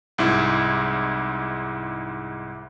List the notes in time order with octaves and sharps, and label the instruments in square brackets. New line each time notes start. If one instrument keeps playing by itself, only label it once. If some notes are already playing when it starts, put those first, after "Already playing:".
[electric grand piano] C2 G#2 E4